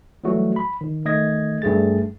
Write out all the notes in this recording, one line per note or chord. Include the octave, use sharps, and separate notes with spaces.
E3 F#3 G3 A3 F#4
B5
D#3
D#3 A3 D#5 G#6 A#6
G2 A3 G#4 A6